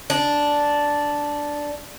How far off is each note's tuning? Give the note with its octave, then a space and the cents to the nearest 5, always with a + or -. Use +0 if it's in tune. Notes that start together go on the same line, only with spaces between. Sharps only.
D4 -5